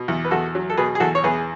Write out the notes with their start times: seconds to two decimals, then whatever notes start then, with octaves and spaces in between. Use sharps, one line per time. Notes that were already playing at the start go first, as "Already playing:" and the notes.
Already playing: B2
0.08 E2
0.25 B4
0.31 E2 F#4 A4
0.55 F#3
0.70 A4
0.77 B2 G#4 B4
0.95 G#4
1.00 E2 F#4 A4
1.15 C#5
1.24 E2 G#4 B4